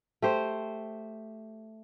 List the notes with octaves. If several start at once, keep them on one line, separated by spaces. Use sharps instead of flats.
A3 G4 C5